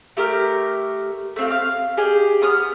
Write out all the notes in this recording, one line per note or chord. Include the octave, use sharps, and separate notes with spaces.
A3 G4 A#4 F6
A3 C4 F4
F5 F6
G4 G#4 D#5
B3 D#6 F6